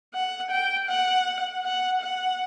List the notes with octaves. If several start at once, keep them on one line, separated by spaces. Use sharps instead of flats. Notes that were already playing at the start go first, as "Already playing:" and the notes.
F#5
G5
F#5
F#5
F#5